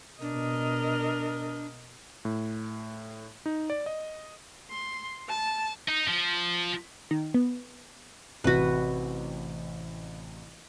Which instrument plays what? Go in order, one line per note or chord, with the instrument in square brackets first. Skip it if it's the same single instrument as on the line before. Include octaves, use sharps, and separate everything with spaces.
[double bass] B2 [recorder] D4 [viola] A#4 D#5
[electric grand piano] A2
D#4
D5
D#5
[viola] C6
A5
[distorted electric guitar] D#4
F3
[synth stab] D#3
B3
[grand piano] A1 C3 [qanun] F#4 B4